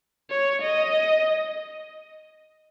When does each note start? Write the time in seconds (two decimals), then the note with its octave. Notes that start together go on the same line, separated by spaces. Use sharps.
0.30 C#5
0.62 D#5